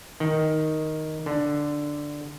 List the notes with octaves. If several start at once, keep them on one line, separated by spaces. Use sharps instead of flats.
D#3
D3